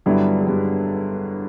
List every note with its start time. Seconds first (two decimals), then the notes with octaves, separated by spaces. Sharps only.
0.06 G2 D3 F#3 G3 B3 E4
0.41 G#3
0.46 G2 G3